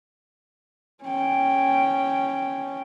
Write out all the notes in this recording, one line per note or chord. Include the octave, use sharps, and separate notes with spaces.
C#4 G5